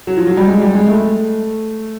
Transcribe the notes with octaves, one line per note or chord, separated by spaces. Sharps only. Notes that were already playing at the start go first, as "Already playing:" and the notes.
F#3
F3
F#3
G3
G#3
G3
G#3
A3